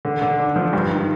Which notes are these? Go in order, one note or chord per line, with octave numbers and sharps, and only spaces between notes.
D3
D3
D4
F3
G2
D#3